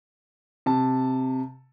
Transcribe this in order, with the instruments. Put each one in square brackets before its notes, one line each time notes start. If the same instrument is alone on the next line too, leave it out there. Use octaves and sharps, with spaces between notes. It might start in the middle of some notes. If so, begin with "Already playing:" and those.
[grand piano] C3 A5